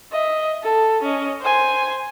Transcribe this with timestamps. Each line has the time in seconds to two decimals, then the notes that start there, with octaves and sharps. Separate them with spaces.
0.12 D#5 E5
0.63 A4
1.02 C#4 D#5
1.41 C5 G#5